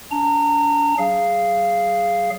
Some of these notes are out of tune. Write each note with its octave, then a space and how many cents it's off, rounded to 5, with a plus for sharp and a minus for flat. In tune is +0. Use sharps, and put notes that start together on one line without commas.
D4 -45 A#5 -30
F#3 +40 G#4 +0 F5 -10